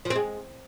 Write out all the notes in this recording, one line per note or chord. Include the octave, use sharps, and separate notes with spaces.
F3
C4
G#3